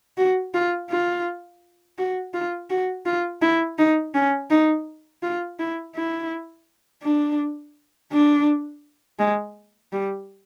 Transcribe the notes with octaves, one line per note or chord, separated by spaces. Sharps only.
F#4
F4
F4
F#4
F4
F#4
F4
E4
D#4
C#4
D#4
F4
E4
E4
D4
D4
G#3
G3